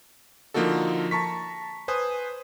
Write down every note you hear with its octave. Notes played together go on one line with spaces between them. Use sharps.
D3 F3 A#3 D#4 F#4 A4
A5 A#5 C#6 B6
B4 C5 G#5 D#6